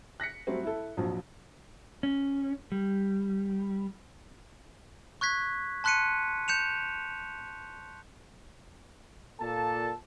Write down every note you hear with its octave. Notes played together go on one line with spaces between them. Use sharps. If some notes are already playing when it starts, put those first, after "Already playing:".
F#6 A#6 B6 C#7
F#3 G3 A3 C4
E4 A4
A#1 F2 F3 F#3
C#4
G3
C#6 F#6 G#6 B6
A5 C6 F#6 B6 C#7 D#7
G6 C#7 E7 F7
A#2 A4 A5